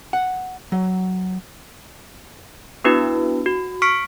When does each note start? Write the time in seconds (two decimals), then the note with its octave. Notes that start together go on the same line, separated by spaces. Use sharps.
0.13 F#5
0.72 F#3
2.84 B3 D4 E4 F#4 B4
3.46 F#4
3.82 C#6 F6 B6 C#7 D7